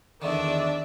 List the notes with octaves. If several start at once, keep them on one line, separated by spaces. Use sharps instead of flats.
E2 D3 D#3 D4 D5 E5